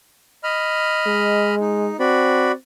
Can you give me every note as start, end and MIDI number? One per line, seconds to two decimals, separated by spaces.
0.44 1.55 75
0.44 1.55 83
0.44 1.55 89
1.07 1.93 56
1.60 1.97 63
2.00 2.54 60
2.00 2.52 66
2.00 2.52 74
2.00 2.52 83